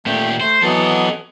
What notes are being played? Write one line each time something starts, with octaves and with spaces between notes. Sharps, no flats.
A#2 A3 G4
A3 C5
E3 F#3 B3 A4 D#5